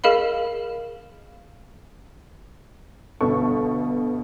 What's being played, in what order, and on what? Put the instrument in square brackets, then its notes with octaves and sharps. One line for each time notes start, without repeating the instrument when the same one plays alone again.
[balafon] G#4 A#4 D#5 F5 B5
[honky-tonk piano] G1 B2 A4 C#6